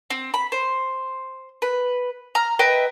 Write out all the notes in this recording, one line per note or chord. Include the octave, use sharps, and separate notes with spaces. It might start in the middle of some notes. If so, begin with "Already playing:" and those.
C4
B5
C5
B4
A#5 F6
B4 D#5 E5 G5